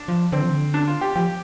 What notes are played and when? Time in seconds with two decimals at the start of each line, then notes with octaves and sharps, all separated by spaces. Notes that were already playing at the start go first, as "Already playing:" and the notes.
Already playing: D4
0.08 F3
0.32 D3 C4
0.42 F3
0.50 D3
0.74 D4
0.88 F4
1.01 G4
1.16 F3 G4